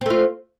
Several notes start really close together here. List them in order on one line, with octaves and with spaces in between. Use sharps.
C4 A3 F4